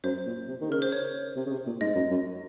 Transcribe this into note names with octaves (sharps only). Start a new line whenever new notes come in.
F#2 C5
A#2
C3
D#3
C#3 A#4
C5
C#5
C3
C#3
C3
A#2
G#2 D#5
F#2
F#2